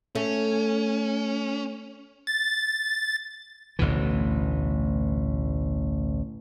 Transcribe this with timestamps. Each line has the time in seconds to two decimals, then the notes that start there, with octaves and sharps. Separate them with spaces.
0.15 A3 C#4
2.27 A6
3.79 A1 D2 B2 E3